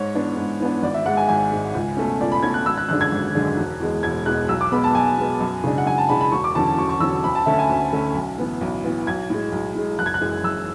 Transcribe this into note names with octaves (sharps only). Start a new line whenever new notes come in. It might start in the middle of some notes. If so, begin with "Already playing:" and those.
Already playing: G#2 C#5
E3 B3 D4
G#2
E3 B3 D4
G#1 D5
E5
G#2 G#3 F#5
G#5
G#1 G#5
G#2 G#3
C#2
B2 A3 C#4
C#2 D5
B5
B2 A3 C#4 G#6
F#6
G#1 E6
F#6
F#2 D3 G#3 D4 F#6
G#6
G#1
F#2 D3 G#3 D4
E1
E2 B2 G#3
E1 G#6
E2 B2 G#3 F#6
B1 E6
D6
B2 G#3 B3 B5
A5
B1 G#5
B2 G#3 B3
F#2
C#3 E3 G#3 D4
F#5
F#2 G#5
A5
C#3 E3 G#3 D4 B5
B5
E1 C#6
D6
E2 D3 F#3 C#4 A5
E1 C#6
C#6
E2 D3 F#3 C#4 E6
D2 B5
A5
D3 A3 C#4 E5
G#5
D2
D3 A3 C#4
B1
A2 E3 B3
B1
A2 E3 B3
B1 G#6
A2 G#3
B1
A2 G#3
F#1 F#6
G#6
F#6
F#2 E3 G#3
F#1 E6